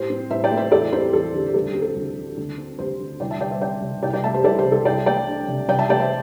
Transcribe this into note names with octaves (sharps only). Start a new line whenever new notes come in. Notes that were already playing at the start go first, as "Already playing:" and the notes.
Already playing: A2 G4 C5
C4
A2 C5 E5
D5 G5
A3
C5 E5
E2 A4 D5
C4 G4 C5
E2 A4
D3 G4
G4
D2 A4
G4
C4
A4
D2
D3
D2
C4
D2 G4 C5
D3
C2 D5 G5
E5 A5
G3 D5 G5
C5 E5
C4 D5 G5
C3
C2 D5 G5
D5 G5
A3 E5 A5
G4 C5
C2 A4 D5
G4 C5
C3
A4
C2 D5 G5
A3 D5 G5
D4
C3
C3 D5 G5
E5 A5
A3 D5 G5
C5 E5